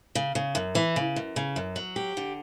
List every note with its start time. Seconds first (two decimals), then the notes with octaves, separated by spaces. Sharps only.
0.15 C#3
0.35 C#3
0.55 F#2
0.75 E3
0.96 C#3
1.16 F#2
1.36 C#3
1.56 F#2
1.76 F#3
1.96 G4
2.17 D3